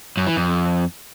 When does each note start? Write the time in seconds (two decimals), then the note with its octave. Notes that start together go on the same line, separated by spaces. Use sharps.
0.17 F#2
0.27 E3
0.36 F2